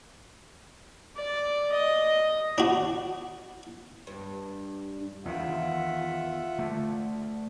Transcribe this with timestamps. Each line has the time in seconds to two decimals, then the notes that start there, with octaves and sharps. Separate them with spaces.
1.16 D5
1.73 D#5
2.58 D4 F#4
4.07 G2
5.25 E2 D#3 F4 E5 F#5
6.58 D3 A3